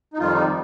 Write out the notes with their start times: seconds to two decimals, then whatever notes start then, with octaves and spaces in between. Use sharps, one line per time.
0.14 D#4
0.18 F2 D#3 F3 G3 F4
0.33 D#3 D#4